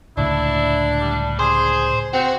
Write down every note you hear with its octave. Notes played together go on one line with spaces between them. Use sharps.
C#2 A2 D3 D4 E4
G3
G#4 C5
C4 F#4 C5